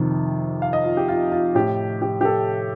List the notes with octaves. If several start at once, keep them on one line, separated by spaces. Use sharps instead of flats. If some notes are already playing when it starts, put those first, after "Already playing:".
Already playing: F2 C3 D#3
F5
D#5
F4
G4
F4
F4
A2 G4
G4
G4
A4